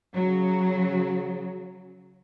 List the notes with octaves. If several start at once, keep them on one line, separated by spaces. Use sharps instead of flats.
C#3 F#3